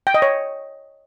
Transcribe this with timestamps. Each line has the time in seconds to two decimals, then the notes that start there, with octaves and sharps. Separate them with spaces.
0.07 G5
0.14 D#5
0.22 C#5